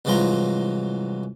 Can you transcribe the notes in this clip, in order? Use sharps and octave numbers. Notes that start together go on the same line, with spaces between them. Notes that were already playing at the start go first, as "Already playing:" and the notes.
C2 G#2 E3 F#3 F4 A#5